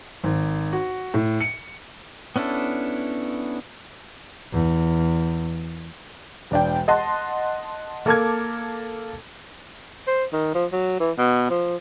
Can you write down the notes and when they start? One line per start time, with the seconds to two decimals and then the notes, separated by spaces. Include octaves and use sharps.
0.24 G#1
0.73 F#4
1.14 A2
1.41 C#7
2.36 B3 C#4 D4 E4 A4
4.52 E2
6.51 E1 D4 G5
6.88 D#5 F#5 A5 C6
8.06 A#3 A4 A5 D6 F6 G#6
10.07 C5
10.33 D#3
10.55 F3
10.72 F#3
11.00 E3
11.18 B2
11.50 F3